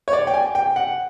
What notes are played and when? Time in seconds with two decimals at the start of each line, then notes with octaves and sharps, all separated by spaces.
0.08 C#5
0.13 D5
0.27 G5
0.34 G#5
0.55 G5
0.76 F#5